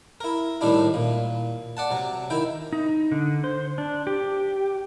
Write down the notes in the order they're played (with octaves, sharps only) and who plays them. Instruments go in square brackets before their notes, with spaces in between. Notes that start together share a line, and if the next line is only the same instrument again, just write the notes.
[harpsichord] E4 A#4
A2 D#3 G3 D4 E4
A#2
D5 F#5 A5
C3 F#3
D#3 E4 G5
[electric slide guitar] D#4
D3
C5
D4
G4